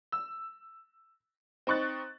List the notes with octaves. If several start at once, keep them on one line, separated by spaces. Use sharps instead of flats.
E6
C4 D#4 C#6 F#6 A6